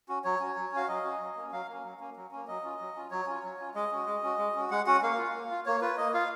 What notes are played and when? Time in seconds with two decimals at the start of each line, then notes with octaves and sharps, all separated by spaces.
0.09 C#4 F#4
0.24 F#3 C#5
0.40 C#4 F#4
0.56 F#3
0.72 C#4 F#4 F5
0.88 F#3 D#5
1.05 C#4 F#4
1.20 F#3
1.36 A#3
1.41 C#4
1.52 F#3 F5
1.68 A#3 C#4
1.84 F#3
2.00 A#3 C#4
2.16 F#3
2.31 A#3 C#4
2.48 F#3 D#5
2.63 C#4 F4
2.80 F#3
2.96 C#4 F4
3.11 F#3 C#5
3.27 C#4 F4
3.44 F#3
3.59 C#4 F4
3.74 G#3 D#5
3.92 C#4 F#4
4.06 G#3
4.23 C#4 F#4
4.38 G#3
4.55 C#4 F#4
4.70 G#3 F#5
4.86 C#4 F#4 F#5
5.02 A#3 F5
5.18 F4
5.34 A#3
5.50 F4
5.66 A#3 C#5
5.82 F4 B4
5.97 A#3 D#5
6.14 F4 F5